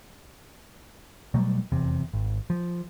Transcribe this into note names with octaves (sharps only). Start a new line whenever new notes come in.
B2 F#3 G3 A3
F1 E2 C3
G#1
F3